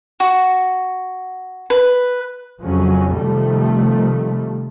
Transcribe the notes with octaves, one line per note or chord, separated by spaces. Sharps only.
F#4
B4
F2 C#3 F3 F#3 C#4
C3 D#3 F3 G3 A3